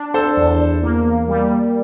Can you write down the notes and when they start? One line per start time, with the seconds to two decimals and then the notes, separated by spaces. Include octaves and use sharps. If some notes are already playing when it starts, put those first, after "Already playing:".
Already playing: D4
0.14 A4 C5
0.37 E2
0.82 A#3
1.28 G3